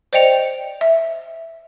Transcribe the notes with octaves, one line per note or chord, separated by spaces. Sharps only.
C5 D5 D#5 G5 C#7 F7
E5